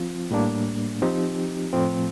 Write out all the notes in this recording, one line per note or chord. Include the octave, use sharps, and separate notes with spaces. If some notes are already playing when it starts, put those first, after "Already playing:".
Already playing: F3 C4 F4
A2 G3 A#3 D4
F3 C4 D#4 G4
A2 F3 A3 C4